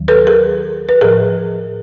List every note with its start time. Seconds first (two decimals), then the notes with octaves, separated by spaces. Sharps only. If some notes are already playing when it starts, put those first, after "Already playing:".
Already playing: D#2 D#3 F#3
0.08 A4 B4
0.27 G#4 A#4
0.89 B4
1.01 A2 F3 G#4 A#4